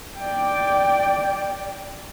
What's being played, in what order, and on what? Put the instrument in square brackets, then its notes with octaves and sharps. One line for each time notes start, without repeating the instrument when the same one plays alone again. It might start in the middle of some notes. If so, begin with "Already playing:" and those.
[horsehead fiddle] D5 G5